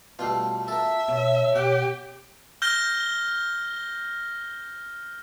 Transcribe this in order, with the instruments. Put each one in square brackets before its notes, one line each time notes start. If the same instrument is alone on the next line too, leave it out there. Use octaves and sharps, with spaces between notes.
[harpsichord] B2 G3 A3 [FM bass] F4
[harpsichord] A4 A#4 [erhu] E5
[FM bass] B2 [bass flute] C#5
[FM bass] B2 [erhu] G4 [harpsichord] F#5
[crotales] F6 G6 A#6 G7